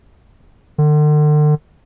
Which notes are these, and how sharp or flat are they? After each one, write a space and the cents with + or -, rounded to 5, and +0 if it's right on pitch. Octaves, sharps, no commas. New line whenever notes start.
D3 +40